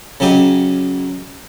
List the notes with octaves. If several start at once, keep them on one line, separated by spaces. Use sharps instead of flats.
C#3 F#3 G4 D#5